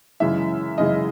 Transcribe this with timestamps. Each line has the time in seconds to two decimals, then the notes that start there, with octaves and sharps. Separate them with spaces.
0.20 F#2 C#3 E3 G#3 E5
0.78 F#2 C#3 E3 G#3 D#5